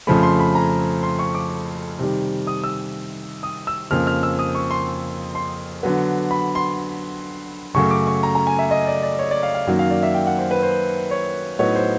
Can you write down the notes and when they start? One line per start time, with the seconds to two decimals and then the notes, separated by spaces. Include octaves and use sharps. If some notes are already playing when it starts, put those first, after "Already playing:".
0.07 F2 C#3 F3 A3 B5
0.23 C6
0.40 B5
0.55 A#5
1.03 C6
1.19 C#6
1.35 D6
1.99 C3 D#3 G3
2.47 D#6
2.64 E6
3.43 D#6
3.67 E6
3.91 F2 C#3 F3 A#3 F6
4.07 F6
4.23 E6
4.39 D#6
4.55 C#6
4.71 C6
5.35 C6
5.83 D3 F#3 B3
6.31 B5
6.55 C6
7.74 F#2 C#3 F#3 A3 C#6
7.91 D6
8.07 C#6
8.23 A#5
8.35 A#5
8.47 G#5
8.59 E5
8.71 D#5
8.87 D5
9.03 D5
9.19 C#5
9.31 D5
9.43 F5
9.55 F5
9.67 F#2 D#3 F#3 A#3
9.79 F5
9.90 D5
10.03 E5
10.14 G5
10.27 F#5
10.38 C5
10.51 B4
10.63 C5
11.11 C#5
11.59 A2 F#3 B3 D#4 C#5
11.75 C5